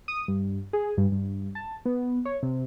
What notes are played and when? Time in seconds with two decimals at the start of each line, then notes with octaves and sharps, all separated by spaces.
0.08 D#6
0.28 G2
0.73 G#4
0.97 G2
1.12 G2
1.55 A5
1.85 B3
2.25 C#5
2.43 C3